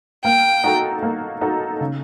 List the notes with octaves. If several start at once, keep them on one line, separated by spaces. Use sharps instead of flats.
A#3 G5
D#4 F#4 A4
A#3
D#4 F#4 A4
C#3